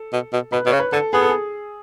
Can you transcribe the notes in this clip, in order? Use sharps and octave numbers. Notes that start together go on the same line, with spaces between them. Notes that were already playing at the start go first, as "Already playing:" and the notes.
Already playing: A4
B2
B2
B2 B4
B2 C#5
C#3
B4
D3 A4
B3 G#4
A4
G#4